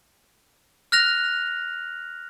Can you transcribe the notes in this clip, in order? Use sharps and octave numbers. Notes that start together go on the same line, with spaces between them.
F6 F#6 A#6 F7